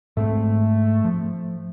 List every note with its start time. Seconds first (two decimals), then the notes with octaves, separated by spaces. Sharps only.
0.17 G#2 G#3 A3 C4
1.05 F3